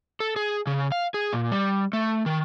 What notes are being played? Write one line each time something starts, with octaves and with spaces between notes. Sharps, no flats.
A4
G#4
C#3
F5
G#4
A#2
G3
A3
D#3